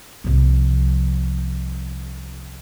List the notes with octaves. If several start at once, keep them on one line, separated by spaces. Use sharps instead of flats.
C2 F3